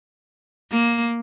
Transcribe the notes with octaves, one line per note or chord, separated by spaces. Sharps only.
A#3